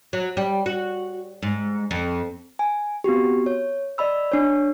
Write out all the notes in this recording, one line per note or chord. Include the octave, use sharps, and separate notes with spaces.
F#3
G3
F#4
G#2
F2
G#5
B3 C4 F#4 G4
C#5
D5 D#5 B5 E6
D4 C#5